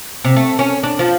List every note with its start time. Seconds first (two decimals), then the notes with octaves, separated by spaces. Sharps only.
0.24 C3
0.36 A3
0.59 C#4
0.83 D4
0.99 F3